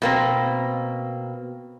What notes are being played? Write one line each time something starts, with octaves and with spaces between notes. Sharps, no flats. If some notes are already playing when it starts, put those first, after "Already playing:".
B2 A#3 C4